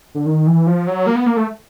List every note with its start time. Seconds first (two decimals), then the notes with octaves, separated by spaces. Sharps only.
0.15 D3
0.26 D#3
0.47 E3
0.67 F3
0.87 F#3
1.07 A#3
1.15 B3
1.26 A#3
1.37 A3